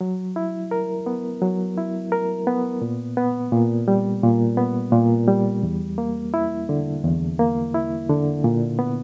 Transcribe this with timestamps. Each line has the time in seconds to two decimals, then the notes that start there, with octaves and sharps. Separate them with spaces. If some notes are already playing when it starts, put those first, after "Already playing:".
0.01 F#3
0.36 E4
0.71 A#4
1.06 B3
1.42 F#3
1.77 E4
2.12 A#4
2.47 B3
2.82 A#2
3.17 B3
3.52 A#2
3.88 G3
4.23 A#2
4.57 B3
4.92 A#2
5.28 G3
5.63 E2
5.98 A#3
6.34 E4
6.69 D3
7.04 E2
7.39 A#3
7.75 E4
8.09 D3
8.44 A#2
8.79 B3